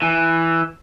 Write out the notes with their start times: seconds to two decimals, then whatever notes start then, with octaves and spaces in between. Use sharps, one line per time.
0.02 E3